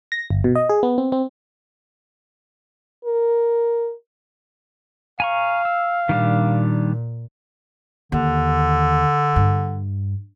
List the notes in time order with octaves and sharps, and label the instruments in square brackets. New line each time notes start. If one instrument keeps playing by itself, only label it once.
[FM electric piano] A#6
G1
B2
D#5
G#4
B3
C4
C4
[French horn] A#4
[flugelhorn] F5 [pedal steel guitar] G#5 A#5 C#6
[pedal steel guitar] E6
[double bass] A#2 [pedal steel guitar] D#3 G3 D4
[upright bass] D#2 [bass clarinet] D3
[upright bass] G2